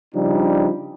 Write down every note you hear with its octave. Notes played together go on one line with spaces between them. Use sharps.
C#3 F3 G3 D4 D#4